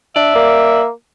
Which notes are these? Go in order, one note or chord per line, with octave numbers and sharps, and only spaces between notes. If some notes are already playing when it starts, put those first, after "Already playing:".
D4 D5 E5
A#3